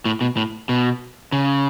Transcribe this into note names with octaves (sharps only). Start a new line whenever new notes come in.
A2
B2
A2
B2
C#3